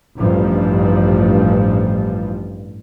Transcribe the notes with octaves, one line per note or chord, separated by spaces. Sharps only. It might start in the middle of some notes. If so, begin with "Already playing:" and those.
A1 G2 F3